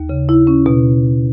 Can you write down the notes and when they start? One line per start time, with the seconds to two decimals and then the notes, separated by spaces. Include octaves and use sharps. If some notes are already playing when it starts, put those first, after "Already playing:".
Already playing: D#2
0.09 C#3
0.29 E4
0.47 C#4
0.66 B2